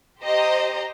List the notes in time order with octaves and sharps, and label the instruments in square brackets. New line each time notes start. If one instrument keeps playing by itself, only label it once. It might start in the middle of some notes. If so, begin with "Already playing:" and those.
[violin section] G4 C5 D#5 A#5